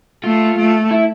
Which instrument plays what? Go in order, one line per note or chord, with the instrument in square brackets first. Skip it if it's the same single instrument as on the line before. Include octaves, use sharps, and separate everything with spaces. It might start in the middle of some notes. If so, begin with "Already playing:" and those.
[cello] A3 [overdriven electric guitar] F4
[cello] A3
[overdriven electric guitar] E4